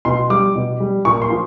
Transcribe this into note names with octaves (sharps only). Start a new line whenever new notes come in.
B2 C6
G3 D6
B2
G3
A#2 C#6
C6
F3